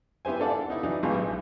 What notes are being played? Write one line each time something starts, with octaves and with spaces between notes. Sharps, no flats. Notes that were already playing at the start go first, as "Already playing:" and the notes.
B3 E4 G4 C5 G#5
D4 A4 D5 F5 F#5
B3 D#4 E4
E3 F#3 D4 D#4
A1 B2 E3 G#3 F4 G4
B1